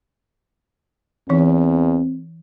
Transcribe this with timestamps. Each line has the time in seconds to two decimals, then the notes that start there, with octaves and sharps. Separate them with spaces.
1.29 E2 E3 C4 D#4